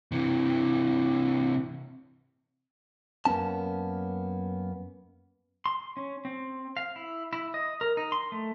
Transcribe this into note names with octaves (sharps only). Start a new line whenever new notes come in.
C3 E3
F#2 A#3 B3 C#4 A5
C6
C#4
C4
F5
E4
E4
D#5
A#4
D#4
C6
A3